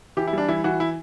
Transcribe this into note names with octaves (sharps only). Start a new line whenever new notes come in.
E3 G4
E4
G3 D4
E3 E4
E3 F#4
E4